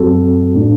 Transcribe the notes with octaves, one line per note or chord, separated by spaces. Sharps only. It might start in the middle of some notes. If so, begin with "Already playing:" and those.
Already playing: F#2 F#3 C4 F#4 A4
A2 A3 D4